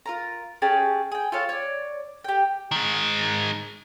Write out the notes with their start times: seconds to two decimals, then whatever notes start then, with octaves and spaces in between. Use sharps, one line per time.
0.06 F4 A#4 A#5
0.62 C#4 G4 G#4 A5
1.12 G#4 G5
1.32 F4 A4 C#5 F5
1.49 C#5 D5
2.24 G4 G5
2.71 D#3 G#3